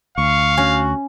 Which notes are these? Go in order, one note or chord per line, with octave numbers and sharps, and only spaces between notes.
D2 F5 C#6
C#4 F#4